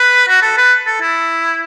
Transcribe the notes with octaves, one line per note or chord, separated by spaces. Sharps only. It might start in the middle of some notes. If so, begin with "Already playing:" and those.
Already playing: B4
F#4
A4
B4
A4
E4